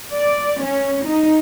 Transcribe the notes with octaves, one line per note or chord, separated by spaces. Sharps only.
D5
C#4
D#4